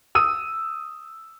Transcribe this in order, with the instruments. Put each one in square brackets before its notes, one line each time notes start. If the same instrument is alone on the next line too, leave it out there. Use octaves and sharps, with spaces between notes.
[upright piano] D#6 E6 D#7